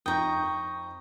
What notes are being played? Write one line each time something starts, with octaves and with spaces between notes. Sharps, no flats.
F2 D#4 G5 A#5 C#6 D#6 G6